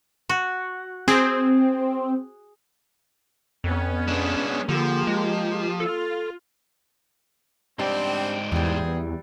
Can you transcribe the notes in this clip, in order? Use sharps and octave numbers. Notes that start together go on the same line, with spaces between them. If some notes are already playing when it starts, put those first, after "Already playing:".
F#4
C4 G#4
F2 B3 C#4
G#3 D4
D3 F3 A#3 G4 G#4
G#3
F4 A4
G#2 G3 C4 D4 D5
E2 E3 F3 G3 C4 G#4